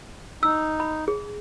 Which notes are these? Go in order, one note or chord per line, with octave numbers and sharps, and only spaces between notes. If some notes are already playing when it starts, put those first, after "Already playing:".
D#4 E6
B5
G#4